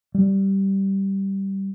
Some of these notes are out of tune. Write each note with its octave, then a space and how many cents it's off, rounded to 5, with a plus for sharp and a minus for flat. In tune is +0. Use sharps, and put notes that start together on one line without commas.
G3 -10